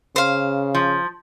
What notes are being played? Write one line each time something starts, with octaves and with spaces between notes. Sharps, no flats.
C#3 C5 F5
F3